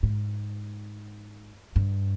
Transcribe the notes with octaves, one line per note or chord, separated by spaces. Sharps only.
G#2
G2